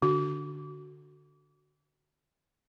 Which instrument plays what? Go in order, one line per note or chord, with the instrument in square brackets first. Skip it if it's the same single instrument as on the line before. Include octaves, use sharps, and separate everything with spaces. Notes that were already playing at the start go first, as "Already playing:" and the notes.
[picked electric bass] D3 [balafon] F#4